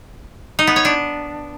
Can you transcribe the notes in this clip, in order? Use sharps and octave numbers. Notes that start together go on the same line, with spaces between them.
D#4
B3
C#5
D4